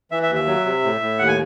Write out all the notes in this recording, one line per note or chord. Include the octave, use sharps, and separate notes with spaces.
E3 E5
E5
D#2
E5
F#3
C3
A2
A2
D#2 F#5
G#5